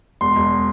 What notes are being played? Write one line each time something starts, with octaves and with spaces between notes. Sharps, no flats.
E1 C6
E1